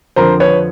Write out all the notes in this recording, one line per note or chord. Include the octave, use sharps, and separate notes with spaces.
F2 D3 F3 A#4 C5
B4 C#5